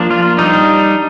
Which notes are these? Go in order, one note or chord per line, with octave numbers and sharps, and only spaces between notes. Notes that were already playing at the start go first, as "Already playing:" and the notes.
Already playing: F3 A#3 D4
F4
G3 D4 D#4